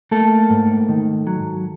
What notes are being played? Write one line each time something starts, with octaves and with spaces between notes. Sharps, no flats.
A3 A#3 A4
G#2
D#3
F#3